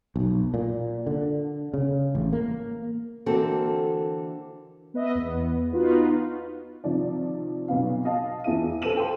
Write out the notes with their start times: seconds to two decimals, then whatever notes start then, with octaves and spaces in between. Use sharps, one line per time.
0.16 B1
0.54 A#2
1.07 D3
1.74 C#3
2.15 A1
2.33 A#3
3.26 D3 E3 A#3 C4 F#4 A4
4.94 B3 B4 D#5 E5
5.15 E2 B3
5.72 B3 D#4 F4 F#4 B4
6.84 C3 D#3 F3 D5
7.68 B1 C3 B3 F5
8.05 D#5 F5 A5
8.44 E2 E4 F4 E5 D#7
8.82 A4 B4 C5 D#7 E7 F#7
8.96 C5 G5 A5 C6